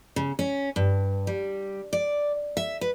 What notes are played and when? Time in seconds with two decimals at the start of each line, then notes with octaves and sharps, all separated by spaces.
0.16 C#3
0.39 C#4
0.76 G2
1.27 G3
1.93 D5
2.57 E5
2.81 B4